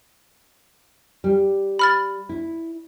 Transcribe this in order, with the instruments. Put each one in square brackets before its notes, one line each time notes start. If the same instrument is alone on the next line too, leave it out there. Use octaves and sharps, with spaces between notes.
[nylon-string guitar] G3
[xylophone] B5 F6 A6
[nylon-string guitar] E4